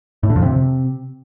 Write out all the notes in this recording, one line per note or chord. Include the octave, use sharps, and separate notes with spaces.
A2
D3
F2
C3